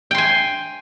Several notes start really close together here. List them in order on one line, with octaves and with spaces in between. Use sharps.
G5 C6 G#5